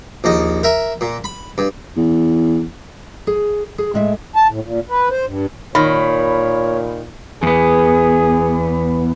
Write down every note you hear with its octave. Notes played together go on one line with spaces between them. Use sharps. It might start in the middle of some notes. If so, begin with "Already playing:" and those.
A#1 D#2 D#5
A#4 E5
A#2
B5
G2
E2
G#4
G#4
A2 G#3 E5
A5
A2
A#2
B4
C5
G2
A#2 D#3 C#5 B5
E2 B3 G#4